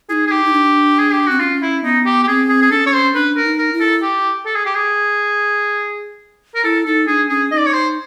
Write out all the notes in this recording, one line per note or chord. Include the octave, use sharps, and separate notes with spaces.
D#4 E4 G#4
G#4
G4
D#4
D4
G#4
G4
C4 F#4
C#4 D4 F4
E4
B3 D#4
G4
G4
C4 G#4
G#4
G#4
C#4 D4 A4
C#5
C5
D4 B4
A#4
D#4
A#4
E4
A4
G4
A4
G#4
G4
G#4
A#4
E4 A4
D#4 A4
D4 G#4
C#4 G#4
D#4 D#5
D5
C#5
C5